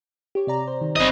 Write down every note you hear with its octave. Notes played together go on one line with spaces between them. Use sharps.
G4 C#5
C3 D5 A#5
C5
D#3
G1 C4 C5 D#5